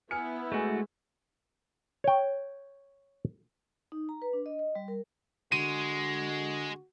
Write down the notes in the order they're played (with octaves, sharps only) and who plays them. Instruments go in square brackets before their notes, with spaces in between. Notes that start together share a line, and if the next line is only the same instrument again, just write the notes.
[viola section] B3 E4 [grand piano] G#5 F6 C#7
[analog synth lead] G#3 [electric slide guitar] A3 F#4 [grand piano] G#5 C#6
[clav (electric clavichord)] C#5 G5
[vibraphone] D#4
A#5
B4
D4
D#5
D#5
G3
A#4
[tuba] D3 [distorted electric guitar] G#3 [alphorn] F#4 [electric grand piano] D#7